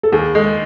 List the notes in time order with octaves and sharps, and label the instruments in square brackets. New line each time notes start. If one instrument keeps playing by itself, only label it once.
[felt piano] A4
[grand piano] D#2 [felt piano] G#4
[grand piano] G#3 [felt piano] A4